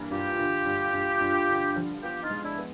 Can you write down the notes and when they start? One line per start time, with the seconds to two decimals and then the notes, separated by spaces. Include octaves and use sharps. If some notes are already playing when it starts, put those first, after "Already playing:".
Already playing: G2 E3 A#3
0.11 G2 F4 G4
0.39 D3
0.66 G2
0.93 G2
1.21 G2
1.49 D3
1.76 F3
2.02 B3 F4 G4
2.23 D#4 F4
2.30 G#3
2.43 D4 E4
2.58 B3